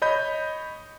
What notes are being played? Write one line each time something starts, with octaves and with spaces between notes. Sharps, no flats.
C#5 D#5 B5 G6